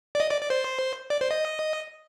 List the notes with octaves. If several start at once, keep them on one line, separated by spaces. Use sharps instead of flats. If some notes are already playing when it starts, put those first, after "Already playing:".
D5
D#5
D5
D5
C5
D5
C5
D#5